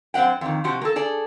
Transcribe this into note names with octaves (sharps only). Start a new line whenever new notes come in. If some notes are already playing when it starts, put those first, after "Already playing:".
F#2 C4 E5 F#5 G5
F2 D#3
C3 F3 F#4 G4
A#3 A4
G#4 A4 D5